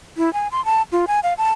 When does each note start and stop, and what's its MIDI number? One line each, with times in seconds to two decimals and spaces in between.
0.17 0.32 64
0.33 0.48 80
0.52 0.64 84
0.65 0.82 81
0.92 1.05 65
1.08 1.20 80
1.23 1.34 77
1.38 1.52 81